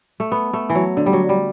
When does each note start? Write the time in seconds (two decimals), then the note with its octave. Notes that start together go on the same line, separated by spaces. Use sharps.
0.20 A3
0.32 B3
0.53 A3
0.70 E3
0.75 F#3
0.97 D3
1.06 G3
1.13 F#3
1.29 G3